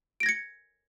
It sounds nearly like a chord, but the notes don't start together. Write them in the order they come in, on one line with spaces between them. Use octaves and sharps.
D7 A#6 G#6 C#7